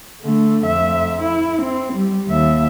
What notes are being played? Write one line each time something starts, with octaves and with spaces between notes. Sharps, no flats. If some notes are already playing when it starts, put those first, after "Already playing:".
D3 A3
F2 E5
E4
C4
G3
D#2 E5